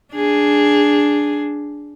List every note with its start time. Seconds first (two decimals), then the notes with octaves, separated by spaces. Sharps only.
0.13 D4 G#4